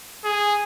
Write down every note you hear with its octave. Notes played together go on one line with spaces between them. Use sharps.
G#4